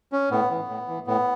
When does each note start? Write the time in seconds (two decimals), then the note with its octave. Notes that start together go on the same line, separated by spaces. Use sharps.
0.12 C#4
0.31 A2 B3
0.51 E3
0.69 A2
0.88 E3
1.07 A2 B3